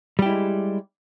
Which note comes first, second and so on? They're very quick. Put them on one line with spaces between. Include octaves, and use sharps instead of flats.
G3 G4 E4 G#3